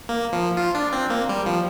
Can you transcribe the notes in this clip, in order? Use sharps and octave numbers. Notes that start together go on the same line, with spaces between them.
A#3
F3
F4
D4
C4
A#3
G3
F3